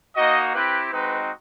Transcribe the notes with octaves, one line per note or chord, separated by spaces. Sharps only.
A#3 D#4 F#4 D#5
C4 E4 G4 B4
G#3 C4 D#4 F#4 B4